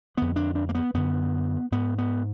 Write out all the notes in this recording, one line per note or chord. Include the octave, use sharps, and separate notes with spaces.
F2 D3 B3
D4
D4
A#3
B3
F#2 D3 B3
G#2 B3
B3